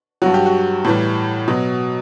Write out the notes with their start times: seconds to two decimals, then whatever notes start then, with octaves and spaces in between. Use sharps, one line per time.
0.22 G2 F#3 F#4
0.34 G4
0.46 F#4
0.84 A2 E3 G3
1.48 B2 F#3